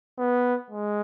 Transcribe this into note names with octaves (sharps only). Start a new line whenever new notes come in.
B3
G#3